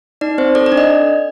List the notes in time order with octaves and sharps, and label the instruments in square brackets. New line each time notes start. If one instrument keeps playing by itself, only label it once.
[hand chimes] D#4 D5
C4 C5
A4 D5
D5
D4
D#5